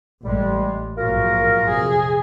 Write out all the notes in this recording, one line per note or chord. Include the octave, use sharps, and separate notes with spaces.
A1 G3 G#3
A#1 G#2 F#3 F4 F#4 A#4
F2 C3 G#4